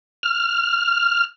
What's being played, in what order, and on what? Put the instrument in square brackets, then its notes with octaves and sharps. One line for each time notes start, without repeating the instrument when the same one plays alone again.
[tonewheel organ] F6